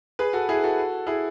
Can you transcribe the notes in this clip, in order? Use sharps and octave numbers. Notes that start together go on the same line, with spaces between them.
G#4 B4
F#4 A4
E4 G#4
F#4 A4
E4 G#4